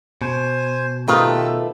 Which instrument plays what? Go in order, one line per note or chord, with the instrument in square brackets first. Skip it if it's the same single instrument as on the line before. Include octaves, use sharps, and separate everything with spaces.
[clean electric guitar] B2 [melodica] C5 G#5
[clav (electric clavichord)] D#3 [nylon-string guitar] A3 F4 B4 [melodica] G4 A4